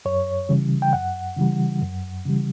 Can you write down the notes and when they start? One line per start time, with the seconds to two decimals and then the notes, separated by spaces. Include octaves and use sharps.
0.05 F#2 C#5
0.49 C#3 E3 G3
0.82 G5
0.93 F#2 F#5
1.37 C#3 E3 G3
1.81 F#2
2.25 C#3 E3 G3